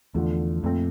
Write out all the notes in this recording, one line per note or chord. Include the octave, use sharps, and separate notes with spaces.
E2 D3 F3 A3
F2 A#2 A3 C4